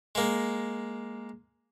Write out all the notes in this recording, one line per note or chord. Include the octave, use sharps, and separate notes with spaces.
G#3 A#3